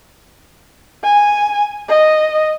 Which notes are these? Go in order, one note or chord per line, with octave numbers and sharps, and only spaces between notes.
G#5
D#5